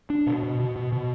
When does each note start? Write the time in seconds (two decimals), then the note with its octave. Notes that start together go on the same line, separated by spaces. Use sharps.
0.10 D4
0.27 B2
0.43 B2
0.60 B2
0.76 B2
0.92 B2